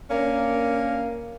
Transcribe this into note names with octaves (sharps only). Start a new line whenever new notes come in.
A#3 C#4 D4 F5